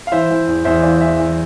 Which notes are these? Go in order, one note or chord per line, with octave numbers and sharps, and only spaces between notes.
F5
E3 C5 E5
E3
E2
E2 C5 E5
E3 D5 F5
E3 C5 E5
E3